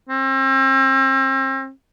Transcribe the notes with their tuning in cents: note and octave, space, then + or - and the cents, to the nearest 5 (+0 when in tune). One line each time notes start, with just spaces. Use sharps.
C4 +40